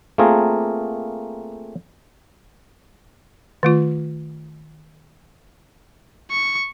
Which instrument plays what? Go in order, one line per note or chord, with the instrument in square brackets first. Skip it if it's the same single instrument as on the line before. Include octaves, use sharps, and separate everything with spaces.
[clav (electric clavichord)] A3 A#3 C4 F4 G#4 A#4
[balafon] D#3 A3 F4
[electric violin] C#6